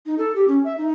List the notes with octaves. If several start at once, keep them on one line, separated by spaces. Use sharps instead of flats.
D#4
A4
G4
C#4
E5
D#4